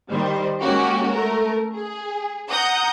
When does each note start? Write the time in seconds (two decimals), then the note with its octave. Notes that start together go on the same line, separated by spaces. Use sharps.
0.11 D#3 G3 C5
0.60 G#3 A#3 C#4 F#4 G4
1.11 A3 A#4
1.74 G#4
2.50 F#5 A#5 D#6 G6